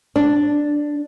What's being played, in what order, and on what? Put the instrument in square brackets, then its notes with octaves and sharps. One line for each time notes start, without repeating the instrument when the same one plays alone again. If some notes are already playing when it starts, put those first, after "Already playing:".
[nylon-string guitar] D4